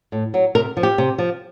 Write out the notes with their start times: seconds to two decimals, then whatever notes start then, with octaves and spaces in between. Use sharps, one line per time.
0.12 A2
0.34 F#3
0.55 C3 A#4
0.77 F3
0.83 G4
0.98 C3
1.18 F3